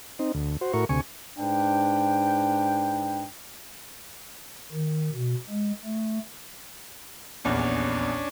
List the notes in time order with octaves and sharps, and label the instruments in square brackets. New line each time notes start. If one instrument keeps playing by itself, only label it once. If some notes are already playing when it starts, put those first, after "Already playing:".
[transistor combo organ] C4 D#4
D2
F#4 C5
A2 E4 F#4 A#4 C#6
D2 C3 G#5 C#6
[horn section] G#2 D4 B4 G5
[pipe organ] D#3
B2
G#3
A3
[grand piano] D#1 A#1 E2 [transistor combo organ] C#4 D4